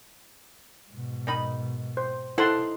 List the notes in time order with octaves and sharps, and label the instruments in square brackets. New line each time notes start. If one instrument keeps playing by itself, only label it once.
[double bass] G#2 B2
[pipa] D#3 D#4 B5
[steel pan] C5
[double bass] D#4 [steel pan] E4 A5 C6 [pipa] A4 C5 F#5